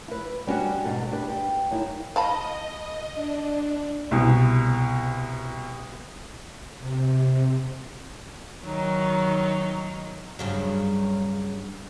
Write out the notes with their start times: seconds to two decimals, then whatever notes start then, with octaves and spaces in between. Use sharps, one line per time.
0.08 E4 B4
0.47 G3 B3 C#4 D4 F#4 G4
0.85 E2 G#2 B2 A4
1.11 D4 G4 B4
1.30 G4
1.71 F#2 D#4 E4
2.16 D#5 F5 A5 B5
3.15 D4
4.11 C2 B2
6.81 C3
8.63 D#3 F#3 D#4
10.39 G2 C#3 F#3